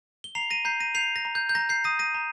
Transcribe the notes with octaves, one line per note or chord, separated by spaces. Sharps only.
G7
A#5 C7 F7
A#6 D#7
A#5 G6 C7
A#6 D#7
G6 C7 F7
A#6
A#5
G6
G6
A#5 A#6
G6 C7
D#6 A#6 D#7
A#6 D#7
A#5